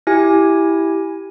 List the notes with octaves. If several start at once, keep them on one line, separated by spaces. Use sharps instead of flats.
E4 G4 G#5